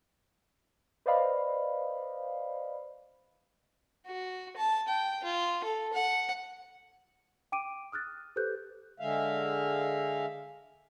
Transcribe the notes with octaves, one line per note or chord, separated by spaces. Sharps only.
B4 C5 D5 D#5 F5 B5
F#4
A5
G5
F4
A4
F#5
G5 D6 D7 D#7
D#6 F6 F#6 A6
G4 A4 B4 C5 F#6 G6
D3 G#3 E5 F5